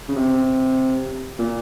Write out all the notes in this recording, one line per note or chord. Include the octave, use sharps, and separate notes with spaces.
C#3
C3
A#2